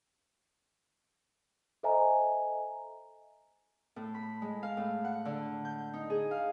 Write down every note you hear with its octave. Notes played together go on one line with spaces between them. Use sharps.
A4 C5 D#5 E5 G#5 A#5
A2
B5
G#3
F5
A2
F#5
D3
G6
D#4
G#4
F5